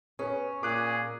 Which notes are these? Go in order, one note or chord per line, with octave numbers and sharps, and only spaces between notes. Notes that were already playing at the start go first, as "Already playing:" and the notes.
C#4 G#4 B4
A#2 G#4 D6 F#6